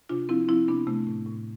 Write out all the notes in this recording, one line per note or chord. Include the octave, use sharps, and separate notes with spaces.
C3 D4 F4
F3 C4 E4
F3 C4 E4
C3 B3 D4
C3 A3
A2
A2